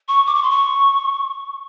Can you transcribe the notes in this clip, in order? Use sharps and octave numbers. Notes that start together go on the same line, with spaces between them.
C#6
D6
C#6
C6
C#6